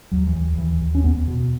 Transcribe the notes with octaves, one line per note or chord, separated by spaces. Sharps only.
D#2 F#3
E3
D#2
D#2 E3
D#2
C#4
E2 B3
B2